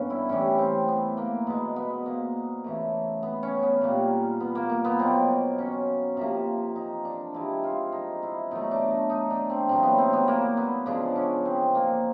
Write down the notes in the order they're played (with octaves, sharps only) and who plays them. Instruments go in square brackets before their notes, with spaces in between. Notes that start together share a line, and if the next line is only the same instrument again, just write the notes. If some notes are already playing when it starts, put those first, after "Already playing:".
Already playing: [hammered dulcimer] G2 D3 A#3 B3 C#4
E4
A2 E3 G3 C#4
C4
B3
A#3
B2 G#3 B3
B3
A#3
C#3 E3 A3
B3
C#4
B3
A#2 G3 A#3
B3
A#3
A#3
B3
B2 F#3 A#3 C4
C#4
C3 F3 A#3
D#4
D4
C3 F3 G#3 E4
F4
D#4
E4
B2 F#3 A3 D#4
D4
D#4
D#4
D4
C4
A2 F#3 A#3 C4
B3
C4
B3
A#3
B3
C#3 F3 G#3 D4
C#4
C4
A#3